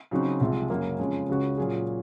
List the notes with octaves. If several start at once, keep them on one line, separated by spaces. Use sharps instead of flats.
C#3 F#3 C4 D#4 F#4
C2 C3 F3 G#3 C4
F#2 C#3 F#3 A#3
F2 C#3 F3 G#3 C#4
C#2 C#3 G#3 C#4 F#4
A#2 F#3 C#4 G#4